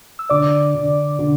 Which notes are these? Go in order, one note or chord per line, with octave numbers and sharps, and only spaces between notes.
E6
D3 D5 D6
D3
D3